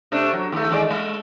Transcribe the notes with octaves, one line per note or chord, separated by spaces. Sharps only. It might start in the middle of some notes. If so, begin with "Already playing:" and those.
C3 A3 D4
F#3
D#2 A3
D#3 G#3 D5
G#3 A3